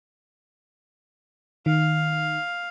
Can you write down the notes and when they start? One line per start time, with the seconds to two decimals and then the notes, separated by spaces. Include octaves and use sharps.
1.66 D#3 F5